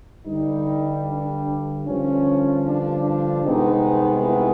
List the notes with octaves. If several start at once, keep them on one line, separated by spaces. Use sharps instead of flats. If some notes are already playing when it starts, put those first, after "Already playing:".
G2 D3 G3 D#4
D4
G2 D3 F3 C#4
D4
D4
C2 C3 D#3 G#3 B3 D#4
E4